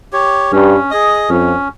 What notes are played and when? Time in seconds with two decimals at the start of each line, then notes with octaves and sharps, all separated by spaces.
0.13 G4 C#5
0.52 G2 C#4
0.91 G#4 D#5
1.29 F2 C#4